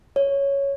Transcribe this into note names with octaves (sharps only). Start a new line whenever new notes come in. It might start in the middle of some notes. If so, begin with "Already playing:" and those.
C#5